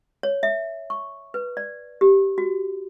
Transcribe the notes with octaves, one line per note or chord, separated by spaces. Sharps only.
C#5
E5
C#6
B4
D5
G4
F#4